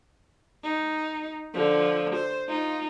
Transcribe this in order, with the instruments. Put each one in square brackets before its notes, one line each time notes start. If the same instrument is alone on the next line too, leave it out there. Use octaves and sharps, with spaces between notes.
[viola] D#4
D3 F3
C5
D#4 F4